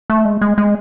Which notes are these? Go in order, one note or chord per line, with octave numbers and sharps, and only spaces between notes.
A3
G#3
G#3
G#3